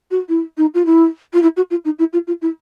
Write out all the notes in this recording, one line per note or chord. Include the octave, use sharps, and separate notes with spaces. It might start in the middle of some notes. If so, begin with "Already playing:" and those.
F#4
E4
D#4
F4
E4
F4
E4
F#4
F4
D#4
E4
F4
F4
E4